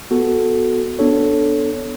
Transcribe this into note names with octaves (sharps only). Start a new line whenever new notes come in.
B3 F#4 A4
B3 D4 A4 C#5